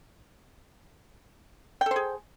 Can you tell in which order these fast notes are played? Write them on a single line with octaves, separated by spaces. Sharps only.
G5 A4 C5 G#4